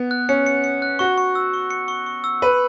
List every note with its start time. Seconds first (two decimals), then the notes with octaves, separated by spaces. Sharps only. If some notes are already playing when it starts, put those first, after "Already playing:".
Already playing: B3
0.11 F#6
0.29 C#4 C#7
0.46 C#7
0.64 C#7
0.82 F#6
0.99 F#4 C#6
1.18 C#6
1.35 E6
1.54 C#6
1.71 C#7
1.88 C#6
2.06 C#6
2.24 E6
2.42 B4 F#7